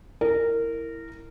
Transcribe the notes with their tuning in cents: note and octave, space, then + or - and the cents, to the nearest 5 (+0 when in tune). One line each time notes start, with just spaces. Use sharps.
E4 +0 A#4 -20